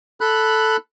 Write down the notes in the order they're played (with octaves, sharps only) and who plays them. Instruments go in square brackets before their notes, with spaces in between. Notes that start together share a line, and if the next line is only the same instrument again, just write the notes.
[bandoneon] A4 B5 F#6